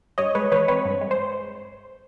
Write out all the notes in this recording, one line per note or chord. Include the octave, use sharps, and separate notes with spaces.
G2 C#5 D#5
G#3 B4 C#5
E3 B4 C#5
C4 B4 C#5
G2
G#3
C5